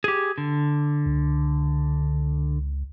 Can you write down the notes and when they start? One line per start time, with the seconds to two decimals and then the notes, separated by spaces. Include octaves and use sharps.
0.04 G4 G#4
0.38 D3
1.06 C#2